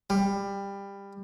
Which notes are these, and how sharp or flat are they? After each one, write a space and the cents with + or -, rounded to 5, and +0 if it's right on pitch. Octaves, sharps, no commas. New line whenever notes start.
G3 +20